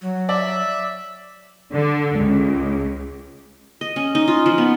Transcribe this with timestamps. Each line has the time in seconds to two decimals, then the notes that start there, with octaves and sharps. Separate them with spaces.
0.02 F#3
0.29 D5 E5
1.73 D3
2.16 C#2
3.81 D#5
3.96 C#4
4.15 D#4
4.28 F4
4.46 F3
4.58 B3